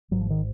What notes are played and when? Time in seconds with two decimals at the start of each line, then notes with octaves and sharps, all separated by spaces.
0.11 G#1 G#2 F#3
0.21 F3
0.30 D#3